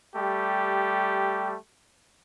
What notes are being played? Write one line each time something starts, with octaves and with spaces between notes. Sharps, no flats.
G3 A3 G4